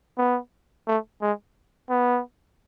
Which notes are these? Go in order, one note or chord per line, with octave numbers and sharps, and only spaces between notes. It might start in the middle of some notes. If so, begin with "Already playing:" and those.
B3
A3
G#3
B3